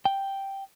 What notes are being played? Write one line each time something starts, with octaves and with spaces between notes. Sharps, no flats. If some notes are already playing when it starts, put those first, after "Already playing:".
G5